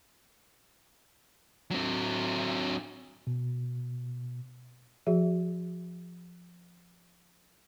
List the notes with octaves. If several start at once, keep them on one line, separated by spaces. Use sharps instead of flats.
F#3 C4
B2
F3 F#4 G#4 E5